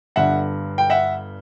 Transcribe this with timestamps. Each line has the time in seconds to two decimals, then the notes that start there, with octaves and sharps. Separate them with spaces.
0.16 G1 G2 D3 E5 F#5
0.78 G5
0.90 E5 F#5